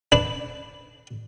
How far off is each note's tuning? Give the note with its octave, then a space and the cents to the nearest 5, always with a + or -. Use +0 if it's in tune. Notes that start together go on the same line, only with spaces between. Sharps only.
D4 +0 B4 +0